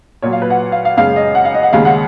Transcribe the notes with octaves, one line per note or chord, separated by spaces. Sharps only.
A#2 F#3 C#5
F5
B4
F#5
F5
F5
F#2 C#3 G#3 F5
D#5
F#5
F5
D#5
F#5
D#2 C#3 G#3 F5
F#5